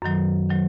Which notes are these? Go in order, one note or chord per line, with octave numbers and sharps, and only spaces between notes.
F#2 D#3 F#3
D#3 F#3